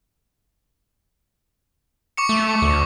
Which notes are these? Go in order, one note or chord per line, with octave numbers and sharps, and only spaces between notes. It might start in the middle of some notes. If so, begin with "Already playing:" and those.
C#6 D6 C#7
A3
D2